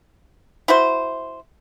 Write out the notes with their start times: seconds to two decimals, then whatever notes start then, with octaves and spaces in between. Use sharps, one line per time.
0.68 E4 F#4 C5